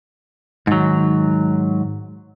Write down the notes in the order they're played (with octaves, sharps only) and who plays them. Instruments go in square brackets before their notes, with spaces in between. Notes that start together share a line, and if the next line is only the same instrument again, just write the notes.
[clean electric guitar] G#2 F#3 [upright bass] D#3